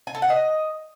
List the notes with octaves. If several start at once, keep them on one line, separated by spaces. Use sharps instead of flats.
G#5
A4
F#5
D#5